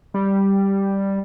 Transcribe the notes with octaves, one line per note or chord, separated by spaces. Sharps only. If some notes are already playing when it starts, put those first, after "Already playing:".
G3